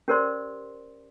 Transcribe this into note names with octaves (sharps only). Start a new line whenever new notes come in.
C#4 G4 A#4 C5 D5 C6